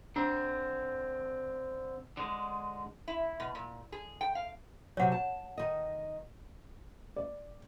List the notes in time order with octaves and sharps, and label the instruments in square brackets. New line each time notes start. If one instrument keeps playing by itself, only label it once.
[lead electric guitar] D3 C4 [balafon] D4
[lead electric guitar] D3 G#3
[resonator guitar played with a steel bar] E4
B2
A#2
G#4
G5
F5
[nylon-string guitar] C3 F#3 [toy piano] C#5 F#5
[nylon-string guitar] A5
D#3 D#5
[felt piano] D5